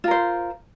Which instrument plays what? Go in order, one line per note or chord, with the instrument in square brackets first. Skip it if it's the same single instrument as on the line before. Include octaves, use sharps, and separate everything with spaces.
[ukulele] F4
A#4
C5